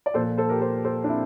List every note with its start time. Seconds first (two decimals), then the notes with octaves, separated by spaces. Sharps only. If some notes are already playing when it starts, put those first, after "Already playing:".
0.06 D5
0.14 A#2 F3 A4 C5
0.38 A4 C5
0.49 G4 A#4
0.61 A4 C5
0.85 A4 C5
1.04 D4
1.09 C4 E4